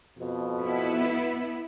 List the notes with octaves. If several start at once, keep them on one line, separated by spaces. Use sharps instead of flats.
F2 B2
B3 E4